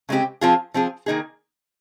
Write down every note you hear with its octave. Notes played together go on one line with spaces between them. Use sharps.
C#3 G#3 C4 G4
F3 C4 F4 G#4
F3 C4 F4 G#4
D#3 A#3 D#4 G#4